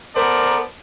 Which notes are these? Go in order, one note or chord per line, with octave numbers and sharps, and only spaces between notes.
B3 A4 A#4 C5 D5